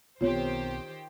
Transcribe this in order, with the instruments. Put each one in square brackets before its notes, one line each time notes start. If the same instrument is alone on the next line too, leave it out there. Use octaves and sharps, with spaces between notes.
[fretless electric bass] B1 B3 C4 [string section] D#3 G4 C5 [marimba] F4 C#5